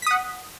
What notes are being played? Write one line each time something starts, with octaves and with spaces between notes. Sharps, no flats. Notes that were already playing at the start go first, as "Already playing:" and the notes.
F#5 D#6 B6